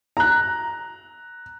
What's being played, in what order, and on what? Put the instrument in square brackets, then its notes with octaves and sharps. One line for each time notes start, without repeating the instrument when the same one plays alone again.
[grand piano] A#5 F#6